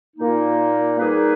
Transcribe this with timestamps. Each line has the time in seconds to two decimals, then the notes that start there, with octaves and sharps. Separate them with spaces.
0.16 A#2 A#3 D#4
0.98 G3 A#3 D#4 G#4 B4